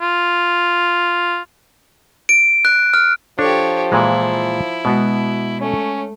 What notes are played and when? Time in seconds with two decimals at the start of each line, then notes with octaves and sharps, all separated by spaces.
0.01 F4
2.29 D7
2.65 F#6
2.94 F6
3.39 F3 D4 G4 A4 C#5
3.92 A#2 E3 G#3 E4
4.85 B2 G#3 B3 F#4
5.61 A3 C#4